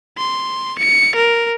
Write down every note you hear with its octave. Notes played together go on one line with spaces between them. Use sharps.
C6
C#7
A#4